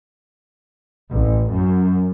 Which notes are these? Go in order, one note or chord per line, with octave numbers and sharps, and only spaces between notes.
A1
F#2